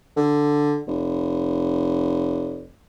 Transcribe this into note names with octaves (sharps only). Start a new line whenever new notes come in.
D3
F1